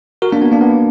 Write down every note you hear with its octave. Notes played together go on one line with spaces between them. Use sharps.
F#4 A#4
A#3 D4
B3
A#3 D4
B3